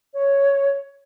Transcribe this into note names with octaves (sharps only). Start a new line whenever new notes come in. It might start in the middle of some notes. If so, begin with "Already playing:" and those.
C#5